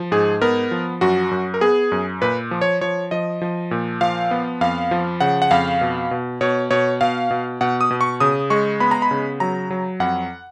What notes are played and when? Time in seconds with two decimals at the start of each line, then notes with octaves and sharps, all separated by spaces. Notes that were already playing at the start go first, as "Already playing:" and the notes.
Already playing: F3
0.12 G#2 G#4
0.42 B3 A#4
0.71 F3
1.01 F#2 F#4
1.31 F#2
1.54 A#4
1.61 B3 G#4
1.92 F#2
2.21 A#2 B4
2.51 F3
2.61 C#5
2.81 F3 C#5
3.11 F3 D#5
3.42 F3
3.71 A#2
4.01 F3 F5
4.31 B3
4.61 F2 F5
4.91 F3
5.20 C#3 F#5
5.42 F#5
5.51 F2 F5
5.81 B2
6.11 B2
6.41 B2 C#5
6.71 B2 C#5
7.01 B2 F5
7.31 B2
7.61 B2 F#5
7.81 D#6
7.91 B2
8.01 C#6
8.20 C#3 D#6
8.50 G#3 C#6
8.80 B3 B5
8.91 A#5
9.02 B5
9.11 C#3
9.40 F#3 A#5
9.70 F#3
10.00 F2 F#5